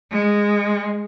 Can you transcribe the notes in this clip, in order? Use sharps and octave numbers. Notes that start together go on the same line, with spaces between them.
G#3